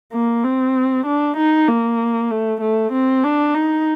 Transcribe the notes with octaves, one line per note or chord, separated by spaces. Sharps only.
A#3
C4
D4
D#4
A#3
A3
A3
C4
D4
D#4